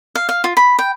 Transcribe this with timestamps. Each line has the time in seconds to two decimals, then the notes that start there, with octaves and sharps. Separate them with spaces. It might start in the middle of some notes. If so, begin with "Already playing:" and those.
0.15 F5
0.29 F5
0.44 F4
0.57 B5
0.79 G5